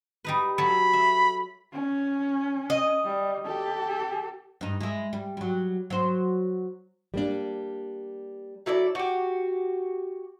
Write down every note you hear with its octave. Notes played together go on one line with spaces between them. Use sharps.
G3 D#4 B4
F#3 A4 C#5 B5
E5
C#4
D#5
G3
G4 A4
G2 D#4
G#3 E4
G3
F#3 G3
F#3 C5
G3 A#3 D4
F#3 E4 A4 D5
F#4 G4